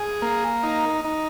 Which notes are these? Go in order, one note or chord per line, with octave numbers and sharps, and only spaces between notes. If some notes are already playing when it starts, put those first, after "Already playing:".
Already playing: G#4
A#3
D#4
D#4